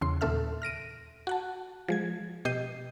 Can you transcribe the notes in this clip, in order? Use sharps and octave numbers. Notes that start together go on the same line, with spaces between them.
E2 C#3 C6
D#2 A#2 C#3 A4 E5 F6
F6 A#6 D7 D#7
F#4 F#5 A5
F3 G#3 G#6
B2 G4 D#5 G6 C7 D#7